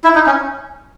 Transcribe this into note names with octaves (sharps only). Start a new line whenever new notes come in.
E4
D#4
C#4